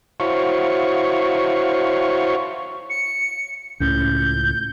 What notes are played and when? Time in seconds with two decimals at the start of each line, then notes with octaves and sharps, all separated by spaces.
0.20 E4 F#4 C5 C#5 F5 C#6
2.89 C#7
3.80 C#2 A2 C#4 G6